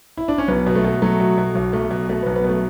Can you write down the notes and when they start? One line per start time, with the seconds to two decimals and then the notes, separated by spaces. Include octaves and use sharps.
0.17 E4
0.28 D4
0.38 C#4
0.48 B1 B3
0.66 B2
0.75 A3
0.84 B2
1.02 F#3 A3
1.20 B2
1.38 B2
1.55 B1
1.73 B1 A3
1.91 B2
2.09 B2 A3
2.22 B1 B3
2.36 B3
2.44 B2 A3